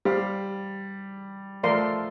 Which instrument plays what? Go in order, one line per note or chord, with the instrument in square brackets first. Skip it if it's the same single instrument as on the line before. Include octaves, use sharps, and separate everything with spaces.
[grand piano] G3 [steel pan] G4 C5 F5
[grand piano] F3 A3 [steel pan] A#4 D5 F5 C6